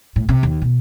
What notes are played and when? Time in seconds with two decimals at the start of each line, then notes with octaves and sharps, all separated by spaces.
0.16 A2
0.29 C3
0.43 D#2
0.61 B2